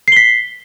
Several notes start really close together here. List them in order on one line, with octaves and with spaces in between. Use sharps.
C7 G7 B6